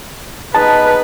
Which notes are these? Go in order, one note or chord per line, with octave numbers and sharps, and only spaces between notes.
B3 D#4 G#4 B4 A5